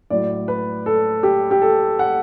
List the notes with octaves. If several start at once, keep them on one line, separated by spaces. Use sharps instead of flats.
A2 F#3 D5
B4
A4
G4
G4
A4
F#5